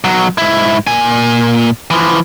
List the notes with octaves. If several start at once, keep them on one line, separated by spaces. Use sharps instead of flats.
B1 F#3
G#2 E4
A#2 G#5
E3 F3